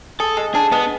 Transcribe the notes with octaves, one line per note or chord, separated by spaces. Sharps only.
G#4 A4
G#3
D4 G#4
G#3 B3